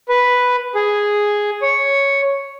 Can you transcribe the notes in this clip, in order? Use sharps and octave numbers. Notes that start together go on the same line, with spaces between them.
B4
G#4
C#5